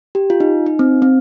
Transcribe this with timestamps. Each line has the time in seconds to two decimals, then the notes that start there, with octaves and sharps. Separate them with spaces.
0.15 G4
0.30 F4
0.40 D#4
0.66 D#4
0.79 C4
1.02 C4